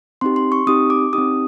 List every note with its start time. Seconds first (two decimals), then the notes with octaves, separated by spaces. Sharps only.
0.21 C4 D#4 G4 C6
0.36 C6
0.52 C#6
0.67 C4 D#4 G4 D#6
0.90 D6
1.13 C4 D#4 G4 D#6